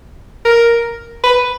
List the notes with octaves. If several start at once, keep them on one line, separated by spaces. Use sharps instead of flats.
A#4
B4